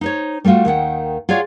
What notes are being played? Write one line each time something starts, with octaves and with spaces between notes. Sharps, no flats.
D#4 C5 C#5
G3 A3 D#4 F4 F#4
D#2 D#3 F#5 G5
F4 F#4 G#4 C#5 D5